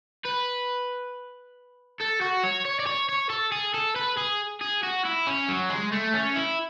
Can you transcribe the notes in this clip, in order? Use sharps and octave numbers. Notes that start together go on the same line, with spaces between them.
B4
A4
F#4
C#5
C#5
D5
C#5
C#5
A4
G#4
A4
B4
G#4
G#4
F#4
E4
C#4
F#3
G#3
A3
C#4
E4